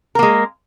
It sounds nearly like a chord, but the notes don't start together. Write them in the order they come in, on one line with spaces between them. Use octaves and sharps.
A#4 A#3 G#3